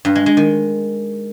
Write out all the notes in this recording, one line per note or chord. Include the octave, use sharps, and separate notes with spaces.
G2
G#3
G#3
D#3